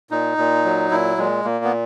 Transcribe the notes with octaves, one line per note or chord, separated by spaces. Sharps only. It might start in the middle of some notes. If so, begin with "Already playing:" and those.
A#2 D#4
A#2
F#3
A#2 E4
A#2 G#3
A#2 A#3
B3